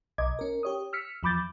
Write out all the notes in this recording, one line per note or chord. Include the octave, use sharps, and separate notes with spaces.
B1 D#5 D6 G#6
C#4 A#4
G4 C#5 D#6
E6 F6 B6 C#7
E2 F3 B5 D6 G6 A6